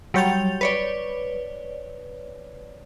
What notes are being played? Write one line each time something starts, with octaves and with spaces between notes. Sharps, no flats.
F#3 G3 C#5 G6 A6 F7
B4 C#5 D5